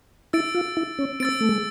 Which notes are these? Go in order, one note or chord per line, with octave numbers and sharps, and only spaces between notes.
E4 E6 A6 D7
F4
E4
C#4
C4 E6 A6 D7
A3
G#3